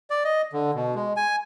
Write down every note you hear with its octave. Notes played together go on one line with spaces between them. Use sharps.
D5
D#5
D3
B2
G#3
G#5